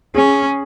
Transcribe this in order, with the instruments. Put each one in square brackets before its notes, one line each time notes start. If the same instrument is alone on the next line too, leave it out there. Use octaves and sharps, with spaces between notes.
[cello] C#4 [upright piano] G#4